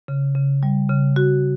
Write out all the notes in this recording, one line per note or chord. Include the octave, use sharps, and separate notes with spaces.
C#3
C#3
G3
C#3
F#4